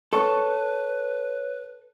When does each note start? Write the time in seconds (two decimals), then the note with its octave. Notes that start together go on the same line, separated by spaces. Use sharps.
0.13 A4 B4 C#5 A5 C#6